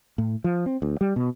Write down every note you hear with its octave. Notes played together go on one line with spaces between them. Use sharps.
A2
F3
C4
D2
G3
B2